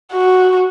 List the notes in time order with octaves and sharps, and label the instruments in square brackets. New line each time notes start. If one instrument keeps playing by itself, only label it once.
[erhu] F#4